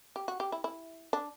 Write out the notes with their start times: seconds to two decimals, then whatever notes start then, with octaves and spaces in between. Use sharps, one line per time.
0.16 G4
0.28 F#4
0.40 G4
0.52 E4
0.64 E4
1.13 D4